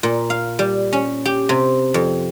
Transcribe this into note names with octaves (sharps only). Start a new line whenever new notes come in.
A#2
F5
G3
C#4
G4
C3
F2